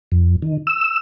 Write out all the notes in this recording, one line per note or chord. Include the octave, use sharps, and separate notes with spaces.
F2
D#3
E6